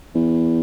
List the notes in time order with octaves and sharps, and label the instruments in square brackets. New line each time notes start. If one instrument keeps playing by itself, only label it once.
[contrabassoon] E2